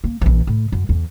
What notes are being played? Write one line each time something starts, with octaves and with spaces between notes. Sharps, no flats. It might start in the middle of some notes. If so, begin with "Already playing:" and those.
A#3
A#1 E3
A2
F#2
E2